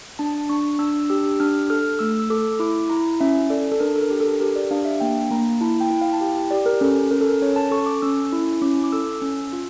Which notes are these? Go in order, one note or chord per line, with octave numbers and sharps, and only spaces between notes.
D4 A5
D4 C#6
D4 E6
G4 E6
D4 F6
A4 F6
A3 E6
E6
A4 D6
E4 D6
E4 A#5
C#4 E5
A4 D5
A4
D4 A#4
A4
A#4
G4
A4
G4 A#4
D5
D4 F5
E5
A#3 G5
A#3 A#5
E4 A5
G5
E4
F5
A5
G4 G5
G4 D5
A#4
C#4 A4
C#4 A#4
A4
A#4
C#4 C#5
A5
A4 C#6
D6
C#4 E6
E4
C#4 D6
D6
A4 E6
C#4
F4